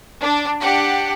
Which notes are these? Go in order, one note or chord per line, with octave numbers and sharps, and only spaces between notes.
D4
D4 G4 F#5